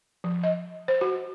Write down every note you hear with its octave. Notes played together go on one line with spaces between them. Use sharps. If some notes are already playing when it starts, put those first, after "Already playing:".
F3
D#5
C5
F#4